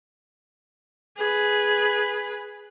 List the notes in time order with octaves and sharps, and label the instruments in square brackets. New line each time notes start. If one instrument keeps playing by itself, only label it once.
[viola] G#4 B4